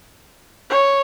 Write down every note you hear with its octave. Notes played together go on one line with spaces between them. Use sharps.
C#5